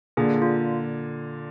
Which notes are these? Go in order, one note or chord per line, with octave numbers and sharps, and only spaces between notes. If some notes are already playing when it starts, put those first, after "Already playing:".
A#2 D3 G#4
F4